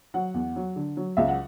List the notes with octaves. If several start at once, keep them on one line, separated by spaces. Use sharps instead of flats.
F#3 F#5
E2
F#3
D3
F#3
C#2 E5
F#5